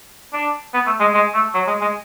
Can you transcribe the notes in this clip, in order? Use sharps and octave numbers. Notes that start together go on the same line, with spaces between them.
D4
B3
A3
G#3
G#3
A3
F#3
G#3
G#3